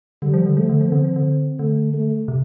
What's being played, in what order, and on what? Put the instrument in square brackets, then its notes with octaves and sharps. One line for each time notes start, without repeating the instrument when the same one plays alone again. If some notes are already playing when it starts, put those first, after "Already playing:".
[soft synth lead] D3 [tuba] G3
[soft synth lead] F3
D3
[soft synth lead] F3 [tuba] A3
[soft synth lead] D3
F3
[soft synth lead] D3 [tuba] C4
[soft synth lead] F3
D3
[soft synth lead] D3 [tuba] A3
[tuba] A3
[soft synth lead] C3